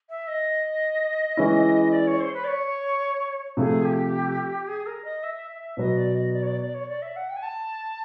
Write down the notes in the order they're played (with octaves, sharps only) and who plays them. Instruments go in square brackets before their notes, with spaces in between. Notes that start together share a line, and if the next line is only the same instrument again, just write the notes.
[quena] E5
D#5
[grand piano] E3 G#3 C#4 E4
[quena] D5
C#5
C5
B4
D5
C#5
[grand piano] C3 F3 A3 [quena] G#4
[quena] G4
G#4
A#4
D#5
E5
E5
[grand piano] B2 F#3 B3 [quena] D#5
[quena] D5
D#5
D5
C#5
D5
D5
C#5
D5
E5
F#5
G5
G#5
A5